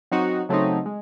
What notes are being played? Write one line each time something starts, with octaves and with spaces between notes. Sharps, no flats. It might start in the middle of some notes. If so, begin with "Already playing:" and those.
F#3 C4 D#4 F#4
C#3 F#3 A3 C4 D#4
G#3